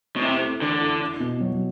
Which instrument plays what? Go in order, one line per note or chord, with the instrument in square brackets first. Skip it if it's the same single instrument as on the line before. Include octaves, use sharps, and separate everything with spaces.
[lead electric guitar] B2
[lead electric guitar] C3 [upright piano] E4
[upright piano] A3
[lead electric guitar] D3 [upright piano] E3
[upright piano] E4
E4
B2
F#3